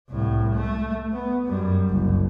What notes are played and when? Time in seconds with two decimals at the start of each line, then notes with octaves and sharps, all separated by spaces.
0.10 C2 A2
0.55 A3
1.13 B3
1.47 F#2 G3
1.90 F#1 C2